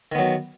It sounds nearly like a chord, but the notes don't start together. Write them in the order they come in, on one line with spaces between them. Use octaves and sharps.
D#3 B3 F#3